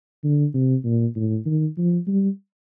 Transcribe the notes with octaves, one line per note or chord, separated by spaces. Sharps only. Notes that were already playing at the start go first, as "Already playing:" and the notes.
D3
C3
A#2
A2
D#3
F3
G3